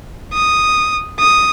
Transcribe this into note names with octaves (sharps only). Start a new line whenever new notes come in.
D#6
D#6